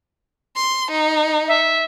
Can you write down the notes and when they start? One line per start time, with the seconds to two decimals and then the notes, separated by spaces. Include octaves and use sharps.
0.56 C6
0.91 D#4
1.48 E5